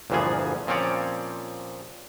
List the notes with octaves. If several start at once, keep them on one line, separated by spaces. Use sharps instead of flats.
G1 D2 A#2 E3 F3 G#4
A#2 F3 C4 C#4 C#5 D5